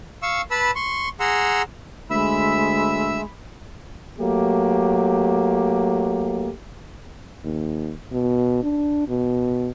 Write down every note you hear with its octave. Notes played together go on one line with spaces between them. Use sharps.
F5 C#6 E6
B4 A5 B5 E6
C6 C#6
G#4 F#5 A#5 C6 E6
D2 G#3 E5 B5 E6
F#3 A3 A#3 G4
D#2
B2
D4
B2